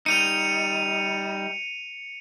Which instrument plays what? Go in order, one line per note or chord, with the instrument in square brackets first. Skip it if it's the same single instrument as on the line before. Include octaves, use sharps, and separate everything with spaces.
[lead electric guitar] G3 D#4 [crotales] C#7 D#7 F7